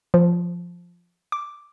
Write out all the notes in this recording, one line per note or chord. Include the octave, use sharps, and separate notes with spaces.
F3
D6